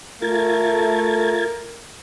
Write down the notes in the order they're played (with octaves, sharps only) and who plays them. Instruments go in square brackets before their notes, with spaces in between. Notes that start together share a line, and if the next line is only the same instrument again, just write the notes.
[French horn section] A3 [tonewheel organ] F4 G#6 A6 [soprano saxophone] A#4